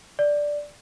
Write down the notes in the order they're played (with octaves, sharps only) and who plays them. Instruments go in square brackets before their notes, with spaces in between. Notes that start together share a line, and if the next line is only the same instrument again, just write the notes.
[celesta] D5